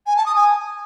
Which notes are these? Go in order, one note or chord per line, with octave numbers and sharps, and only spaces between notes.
G#5
A5
D#6
G#5